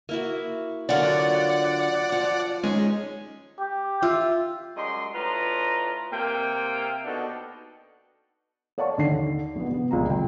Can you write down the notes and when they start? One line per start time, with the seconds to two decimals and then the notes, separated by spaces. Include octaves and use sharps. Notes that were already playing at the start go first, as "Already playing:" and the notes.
0.09 A#3 E4 F#4
0.89 D3 F#3 A#3 F4 A#4 D5 F#5
2.12 F3
2.64 G#3 C#4 D#4
3.60 G4
4.02 F4 E5
4.76 F#2 G3 G#3 D#5 C6
5.14 A2 D4 F4 B4 A#5
6.12 C3 A#3 G5
7.05 B2 B3 D4 D#4 A4 F#5
8.78 C#5 D5 F5 F#5 A5 C#6
8.97 D#2 D3 D#3 C7
9.56 A#1 B3
9.70 C3 B3
9.91 C#2 A#2 A#5
10.10 F#1 G5